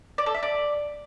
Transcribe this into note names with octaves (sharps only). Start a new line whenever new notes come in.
D5
A4
E5
D5